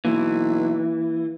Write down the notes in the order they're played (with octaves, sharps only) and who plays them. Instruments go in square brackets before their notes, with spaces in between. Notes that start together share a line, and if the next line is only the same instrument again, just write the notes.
[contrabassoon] B1 [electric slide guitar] E3 [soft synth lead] A#3